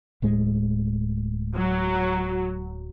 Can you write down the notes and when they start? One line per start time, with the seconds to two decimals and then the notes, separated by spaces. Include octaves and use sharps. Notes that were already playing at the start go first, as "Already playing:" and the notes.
0.22 D1 A2 G#3
1.57 F#3